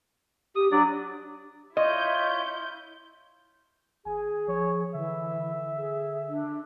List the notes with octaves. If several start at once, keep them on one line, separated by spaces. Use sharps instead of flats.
G4 D#6
F#3 D4 D5
E4 F4 C#5 D#5 G6
G#1 G#4 G#5
F3 C#5
D3 E3 E5
D3
G#4
D4